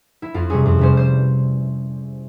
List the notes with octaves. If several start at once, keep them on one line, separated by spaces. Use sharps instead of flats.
E4
F2 F4
C3 G3 C#4 G#4
F2
C3 G3 C#4 C5
C5